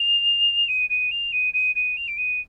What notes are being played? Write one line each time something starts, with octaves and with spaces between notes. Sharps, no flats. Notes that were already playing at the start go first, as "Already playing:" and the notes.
Already playing: F7
D#7
D#7
F7
D#7
D#7
D#7
F7
D7
D#7